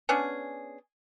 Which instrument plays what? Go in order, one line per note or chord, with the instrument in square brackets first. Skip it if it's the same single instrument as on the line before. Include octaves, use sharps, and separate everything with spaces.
[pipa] B3 C#4 D4 G#4